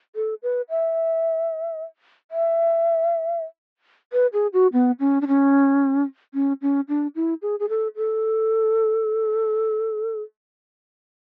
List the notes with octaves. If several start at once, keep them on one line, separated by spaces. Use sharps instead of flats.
A4
B4
E5
E5
B4
G#4
F#4
B3
C#4
D4
C#4
C#4
C#4
D4
E4
G#4
G#4
A4
A4